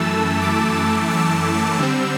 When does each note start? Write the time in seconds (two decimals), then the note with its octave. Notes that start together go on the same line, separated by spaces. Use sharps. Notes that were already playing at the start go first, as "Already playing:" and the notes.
Already playing: F#2 E3 A3 A5 E6
0.42 D6
1.10 E6
1.78 D3 G3 C4